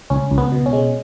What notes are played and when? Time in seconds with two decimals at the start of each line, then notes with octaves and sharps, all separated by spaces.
0.10 C#2 C#4
0.31 C#2
0.38 B3
0.52 B2
0.66 C#4
0.73 G#3